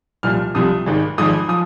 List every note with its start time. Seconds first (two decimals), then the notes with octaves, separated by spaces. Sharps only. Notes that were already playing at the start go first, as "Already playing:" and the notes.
0.23 C2 A#2 F3 F6
0.55 C2 C3 F3 D#6
0.86 G#1 G#2 D#3
1.18 G#1 G#2 F3 D#6
1.49 F3 D#6